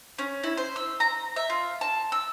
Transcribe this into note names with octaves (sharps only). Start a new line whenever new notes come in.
C#4
E4
C5
E6
A#5
E5
F4
A5
E6